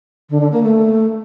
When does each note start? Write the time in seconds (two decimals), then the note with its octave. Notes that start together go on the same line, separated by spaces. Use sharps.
0.30 D3
0.41 D3
0.52 A#3
0.63 A3